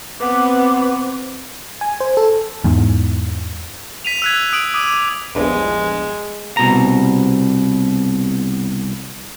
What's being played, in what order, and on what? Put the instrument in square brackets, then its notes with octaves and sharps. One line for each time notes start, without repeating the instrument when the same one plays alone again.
[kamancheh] B3 [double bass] C4 [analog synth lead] B4 [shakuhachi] D6
[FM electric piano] G#5
C5
A4
[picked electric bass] E2 G#2
[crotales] B6 D#7 F7
E6 F#6 G#6
D#6 D7 F#7
D6 D#6 D#7
[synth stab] A#1 E2 G2 [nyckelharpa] G#3
[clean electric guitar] C2 B2 A#5